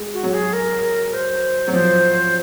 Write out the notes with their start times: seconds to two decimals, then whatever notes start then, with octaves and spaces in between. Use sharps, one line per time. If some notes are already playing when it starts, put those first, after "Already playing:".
Already playing: G#3
0.14 F#4
0.23 F#3
0.34 G#4
0.53 A#4
1.14 C5
1.68 F#3
1.73 F3 C5